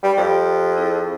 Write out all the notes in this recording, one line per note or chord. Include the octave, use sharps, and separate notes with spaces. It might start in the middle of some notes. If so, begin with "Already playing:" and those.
G3 B5
F2 G4 G5
C4 E4 G#4